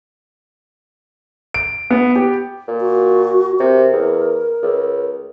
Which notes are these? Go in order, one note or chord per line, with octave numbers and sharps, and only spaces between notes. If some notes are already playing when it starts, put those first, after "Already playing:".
D7
B3
G4
A#2
F#4
C3 A#4
E2
C#2